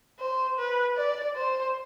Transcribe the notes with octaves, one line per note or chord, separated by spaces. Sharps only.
C5
B4
D5
C5